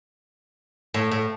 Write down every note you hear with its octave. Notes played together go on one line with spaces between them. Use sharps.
A2
A2